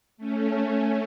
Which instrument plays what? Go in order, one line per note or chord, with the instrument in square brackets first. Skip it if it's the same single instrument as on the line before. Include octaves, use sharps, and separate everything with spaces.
[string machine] A3 C#4